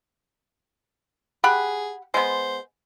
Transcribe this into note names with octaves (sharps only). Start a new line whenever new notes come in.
G4 G#4 F#5 B5
G#3 B3 C5